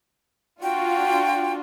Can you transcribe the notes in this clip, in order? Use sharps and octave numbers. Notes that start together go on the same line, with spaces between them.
D4 F4 F#4 G5